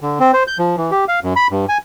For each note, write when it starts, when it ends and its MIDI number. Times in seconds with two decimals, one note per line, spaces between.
0.01 0.19 50
0.20 0.32 60
0.34 0.43 72
0.47 0.58 91
0.59 0.76 53
0.77 0.91 52
0.91 1.05 67
1.08 1.20 77
1.23 1.33 42
1.36 1.47 83
1.51 1.66 43
1.69 1.78 80